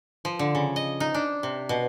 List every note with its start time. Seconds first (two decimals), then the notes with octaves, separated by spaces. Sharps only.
0.25 F3
0.39 D3
0.55 C#3
0.76 D#5
1.00 D#4
1.14 D4
1.43 C3
1.69 B2